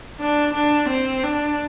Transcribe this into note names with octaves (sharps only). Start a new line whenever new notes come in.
D4
D4
C4
D4